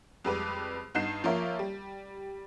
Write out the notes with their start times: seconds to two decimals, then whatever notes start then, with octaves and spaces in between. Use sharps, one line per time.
0.25 F2 G3 G#3 B4 D6
0.95 G2 B3 D#4 G6 C7 E7
1.24 F3 A#3 F4 A#4 C#5 E5
1.59 G3